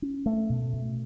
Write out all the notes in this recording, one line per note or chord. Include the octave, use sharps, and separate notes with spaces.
C#4
A3
B2
B2